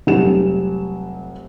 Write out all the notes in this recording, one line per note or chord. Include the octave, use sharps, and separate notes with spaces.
F1 F#3 G3 E7